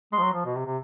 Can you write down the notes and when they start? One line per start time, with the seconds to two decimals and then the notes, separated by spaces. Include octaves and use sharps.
0.12 G#3 C6
0.19 F3
0.23 F#3
0.34 F3
0.45 B2
0.55 C3
0.66 C3